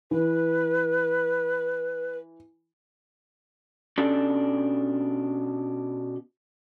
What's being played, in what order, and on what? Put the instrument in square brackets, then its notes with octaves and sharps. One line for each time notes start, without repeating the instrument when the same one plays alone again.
[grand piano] E3 [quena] B4
[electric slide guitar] B2 C#4 D4 G4 A4 D5